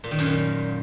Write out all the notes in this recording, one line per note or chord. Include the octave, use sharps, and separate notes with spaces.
A#2
D#3
F#2
A#2